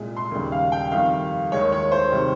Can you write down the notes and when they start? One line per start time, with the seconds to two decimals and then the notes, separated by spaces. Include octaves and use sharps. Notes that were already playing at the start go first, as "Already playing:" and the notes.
Already playing: C2 A#2 G#3
0.17 C6
0.31 D#2 C#3 G3
0.52 F5
0.72 G5
0.92 F2 D#3 G3 F5
1.52 D#2 D#3 G#3 C#5
1.72 C#5
1.92 C5
2.12 C3 D#3 G3